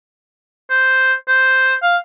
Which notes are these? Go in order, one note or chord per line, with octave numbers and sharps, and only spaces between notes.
C5
C5
F5